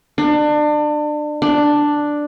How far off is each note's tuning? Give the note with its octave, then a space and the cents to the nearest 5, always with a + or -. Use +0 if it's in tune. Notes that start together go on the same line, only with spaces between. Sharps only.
D4 +30
D4 +5